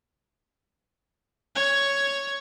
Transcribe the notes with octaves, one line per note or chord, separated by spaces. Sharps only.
C#5